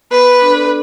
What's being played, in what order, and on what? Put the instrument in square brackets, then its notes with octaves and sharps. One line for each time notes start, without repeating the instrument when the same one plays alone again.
[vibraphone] B3 [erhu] B4
[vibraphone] D4 A4 D5